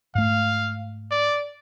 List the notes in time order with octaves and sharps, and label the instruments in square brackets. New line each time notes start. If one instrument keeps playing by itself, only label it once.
[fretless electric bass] G#2 A3 [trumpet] F5
[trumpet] D5